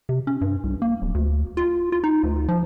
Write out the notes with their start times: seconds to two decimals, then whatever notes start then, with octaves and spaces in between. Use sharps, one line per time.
0.09 C3
0.27 C#4
0.41 G2
0.64 C2
0.82 A#3
1.02 D1
1.15 D2
1.57 F4
1.92 F4
2.04 D#4
2.23 D2
2.48 F3